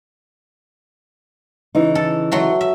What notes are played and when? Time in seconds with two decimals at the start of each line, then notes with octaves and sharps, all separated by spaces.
1.75 C#3 E3 D#4
1.95 A4
2.32 F#3 A3 C6
2.61 E5